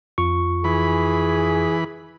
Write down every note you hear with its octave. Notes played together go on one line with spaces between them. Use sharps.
F2 F4 C#6
E3 G#4 B5